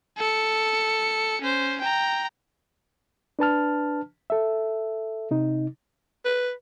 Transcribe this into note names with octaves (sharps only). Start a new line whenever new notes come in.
A4 C#7
C#4 C5
G5 A#5
D4 B4 A5 F6
A4 E5
C3 D#4
B4